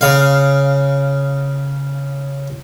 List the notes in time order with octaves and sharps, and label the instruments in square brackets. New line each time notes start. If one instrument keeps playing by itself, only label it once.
[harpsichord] C#3 F5